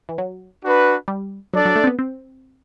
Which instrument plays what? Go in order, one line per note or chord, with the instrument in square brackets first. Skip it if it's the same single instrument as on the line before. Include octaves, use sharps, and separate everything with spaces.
[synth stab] E3
F#3
[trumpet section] D4 F#4 B4
[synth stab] G3
[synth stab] F#3 [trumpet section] D4 A4 D5
[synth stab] F#3
A3
C4
B3
C4